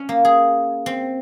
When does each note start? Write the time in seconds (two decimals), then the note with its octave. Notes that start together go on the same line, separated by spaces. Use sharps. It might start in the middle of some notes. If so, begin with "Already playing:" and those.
Already playing: C#4
0.09 A#3
0.25 G#4
0.86 C4